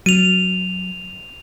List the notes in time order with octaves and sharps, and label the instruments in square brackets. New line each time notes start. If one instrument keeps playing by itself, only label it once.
[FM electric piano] F#3 [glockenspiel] D#7 F7